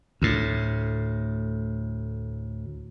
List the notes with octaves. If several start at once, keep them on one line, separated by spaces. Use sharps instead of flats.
D2 A2